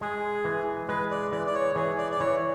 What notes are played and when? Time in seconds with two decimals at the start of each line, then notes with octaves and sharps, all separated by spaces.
0.01 G#3 G#4
0.45 E3
0.88 G#3 B4
1.11 D5
1.32 E3 D5
1.47 D5
1.55 C#5
1.75 E3 G#4
1.98 D5
2.12 D5
2.20 E3 C#5